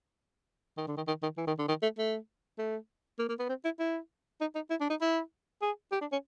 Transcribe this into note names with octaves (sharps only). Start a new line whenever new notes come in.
D#3
D3
D#3
D#3
D#3
E3
D#3
D3
D#3
A3
A3
A3
A#3
A#3
B3
C4
E4
E4
D#4
D#4
E4
D4
D#4
E4
G#4
G4
D4
C#4